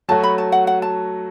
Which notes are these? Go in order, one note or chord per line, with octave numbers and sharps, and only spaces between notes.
F#3 A3 F#4 A5
B5
A5
F#5
F#5
A5